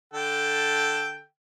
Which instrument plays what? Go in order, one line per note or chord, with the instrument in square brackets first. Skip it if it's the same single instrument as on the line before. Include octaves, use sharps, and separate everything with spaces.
[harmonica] D3 A4 G5